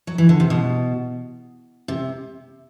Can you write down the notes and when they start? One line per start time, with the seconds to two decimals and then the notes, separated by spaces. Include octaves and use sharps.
0.07 F#3
0.18 E3
0.29 D3
0.40 C3
0.50 B2
1.88 C3